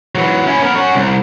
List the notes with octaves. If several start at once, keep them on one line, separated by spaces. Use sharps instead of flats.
E3 F#3
C#4 E4
B3 A#4
C#4 F#4
C2